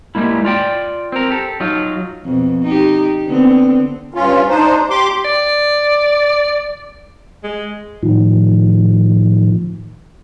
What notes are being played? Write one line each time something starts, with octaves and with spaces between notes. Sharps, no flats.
G3 G#3 A#3 E4
F4 D5 G5
C4 A#4
G4 A4
F#3 D#4 F4
F2 B2
D#4 G4
D3 B3 C4
G2 C#4 F4
D4 D#4 C5
G4 C6 D6
D5
G#3
A2 D#3 F3